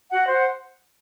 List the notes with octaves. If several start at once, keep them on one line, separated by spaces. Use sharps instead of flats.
F#4 F#5
C5
F#5